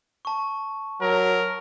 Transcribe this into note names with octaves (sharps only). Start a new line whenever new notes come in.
A5 C#6
F#3 A#4